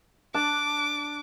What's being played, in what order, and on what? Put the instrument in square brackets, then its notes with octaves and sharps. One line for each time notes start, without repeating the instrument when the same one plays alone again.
[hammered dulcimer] D4 A5 [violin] D6